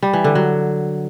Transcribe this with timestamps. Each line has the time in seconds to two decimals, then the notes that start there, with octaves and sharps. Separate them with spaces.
0.03 G3
0.13 E3
0.24 D3
0.35 F#3